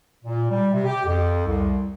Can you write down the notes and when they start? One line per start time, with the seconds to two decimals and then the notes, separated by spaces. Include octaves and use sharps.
0.24 A#2
0.50 G3
0.72 C3
0.85 G4
1.05 F2
1.46 C2